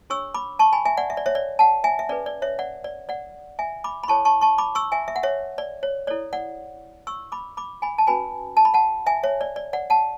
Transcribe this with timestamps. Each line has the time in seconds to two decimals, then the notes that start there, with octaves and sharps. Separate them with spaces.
0.10 D4 G#4 C#5 C#6 E6
0.34 B5 D6
0.59 A5 C#6
0.73 G#5 B5
0.85 E5 G#5
0.97 D5 F#5
1.10 E5
1.17 D5
1.26 C#5 E5
1.35 D5
1.59 F#5 A5
1.84 E5 G#5
1.99 E5
2.09 C#4 G#4 B4 D5
2.26 D5
2.42 C#5 E5
2.59 D5 F#5
2.84 D5
3.09 D5 F#5
3.59 E5 G#5
3.84 B5 D6
4.03 B5
4.08 E4 G#4 C#5 A5 C#6
4.25 A5 C#6
4.41 A5 C#6
4.58 B5 D6
4.75 C#6 E6
4.92 E5 G#5
5.08 E5
5.16 F#5
5.23 C#5 E5
5.58 D5
5.83 C#5
6.07 E4 A4 C#5 D5
6.33 D5 F#5
7.07 C#6 E6
7.32 B5 D6
7.57 B5 D6
7.82 G#5 B5
7.98 A5
8.07 C#4 F#4 B4 G#5 B5
8.57 A5
8.65 B5
8.74 F#5 A5
9.06 E5 G#5
9.23 C#5 E5
9.41 D5
9.56 D5
9.73 D5 F#5
9.90 F#5 A5